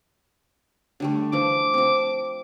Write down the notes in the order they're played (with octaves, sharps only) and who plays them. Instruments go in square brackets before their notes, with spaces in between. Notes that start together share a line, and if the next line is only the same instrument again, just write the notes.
[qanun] D3 G3 A3
[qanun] E3 F3 [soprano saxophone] D6
[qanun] F3 C4